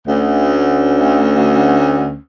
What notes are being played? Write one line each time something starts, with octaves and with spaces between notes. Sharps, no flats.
D2 C#4